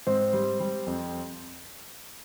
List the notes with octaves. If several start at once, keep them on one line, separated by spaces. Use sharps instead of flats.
G#2 C4 C5
G3
G3
F2